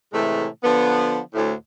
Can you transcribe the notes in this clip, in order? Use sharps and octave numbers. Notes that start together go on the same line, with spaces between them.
A2 C3 E3 G#3 A3
D3 F3 B3
D2 A2